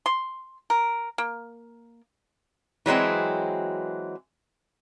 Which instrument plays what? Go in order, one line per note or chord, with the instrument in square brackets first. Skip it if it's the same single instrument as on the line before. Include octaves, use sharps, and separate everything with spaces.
[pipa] C6
A#4
A#3
[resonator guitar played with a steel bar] E3 F#3 G#3 C4